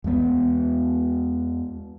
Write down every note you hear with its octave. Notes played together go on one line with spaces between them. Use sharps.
E2 G#3 B3